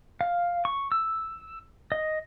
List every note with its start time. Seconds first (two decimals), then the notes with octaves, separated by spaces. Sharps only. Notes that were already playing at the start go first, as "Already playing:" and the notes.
0.21 F5
0.65 C#6
0.92 E6
1.92 D#5